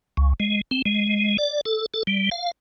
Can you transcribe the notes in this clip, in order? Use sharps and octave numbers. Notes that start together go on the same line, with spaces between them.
C#2
G#3
C4
G#3
D5
A4
A4
G3
F5